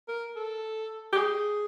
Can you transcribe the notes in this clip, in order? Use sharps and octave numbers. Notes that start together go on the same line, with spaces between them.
A#4
A4
G4
G#4